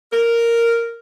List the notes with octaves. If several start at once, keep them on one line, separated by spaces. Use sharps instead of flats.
A#4